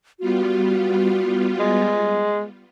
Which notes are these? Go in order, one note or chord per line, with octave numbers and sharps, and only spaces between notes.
G3 B3 F4 F#4
G#3